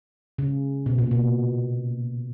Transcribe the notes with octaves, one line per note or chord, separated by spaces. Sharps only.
C#3
B2
A#2
B2